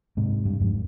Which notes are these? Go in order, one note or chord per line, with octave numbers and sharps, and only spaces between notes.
G#2 C3
G2
F2 G#2